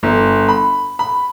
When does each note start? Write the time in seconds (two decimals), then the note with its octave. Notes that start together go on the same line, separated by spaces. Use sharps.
0.03 G1
0.48 B5
0.99 B5